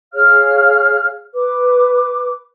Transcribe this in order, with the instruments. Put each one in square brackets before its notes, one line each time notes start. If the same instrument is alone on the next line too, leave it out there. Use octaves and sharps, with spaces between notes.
[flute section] G#4 C#5 F5 F6
B4 D6